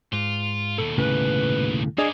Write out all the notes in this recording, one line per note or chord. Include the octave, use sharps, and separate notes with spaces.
G#2 F4
D#2 B2 A4
C2 A2 C#3 B4
A#3 B3 D4 G#4 D5 D#5